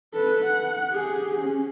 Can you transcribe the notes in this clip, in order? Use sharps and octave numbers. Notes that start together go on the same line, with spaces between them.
A4 B4
F#5
G4 G#4
C#4